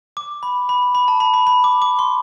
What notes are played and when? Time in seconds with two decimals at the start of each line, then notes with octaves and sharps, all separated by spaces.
0.17 D6
0.43 B5
0.69 B5
0.95 B5
1.08 A5
1.20 B5
1.34 B5
1.47 B5
1.64 D6
1.82 D6
1.99 C6